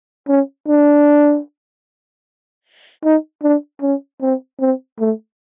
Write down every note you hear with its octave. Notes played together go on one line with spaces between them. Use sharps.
C#4
D4
D#4
D4
C#4
C4
C4
A3